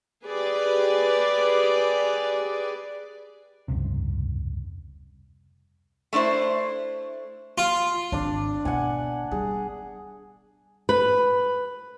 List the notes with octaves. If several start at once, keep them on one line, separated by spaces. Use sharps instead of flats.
G4 G#4 B4 D5
F1 C#2 G2 C3
A3 D4 E4 C5
F4
G#1 D4 D5
B2 F#5 G#5
G3 G#4
B4